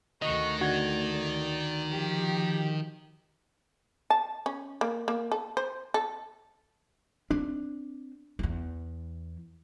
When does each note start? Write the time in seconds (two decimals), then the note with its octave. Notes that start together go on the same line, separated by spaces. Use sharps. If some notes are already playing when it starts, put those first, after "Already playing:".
0.22 D2 D#3 A3 F#4 D#5
0.61 D3 F#4 D5 G#6
1.91 F3 G4
4.10 A5
4.46 C#4
4.81 A#3
5.08 A#3
5.32 A4
5.57 C5
5.94 A4
7.31 C4 D4
8.39 E2 E3